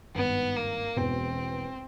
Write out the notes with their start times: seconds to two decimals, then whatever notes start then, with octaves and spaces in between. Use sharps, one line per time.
0.15 G#1 G2 D#3 B3
0.56 A#3
0.96 E1 E2 B2 C4